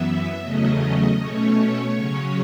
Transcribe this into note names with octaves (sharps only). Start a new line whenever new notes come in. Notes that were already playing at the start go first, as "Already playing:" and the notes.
Already playing: F#2 E3 B3 E5
E2 C#3 F#3 A3 C#4 D#5
B2 A3 C#4 C#5
C#3 F#3 C#4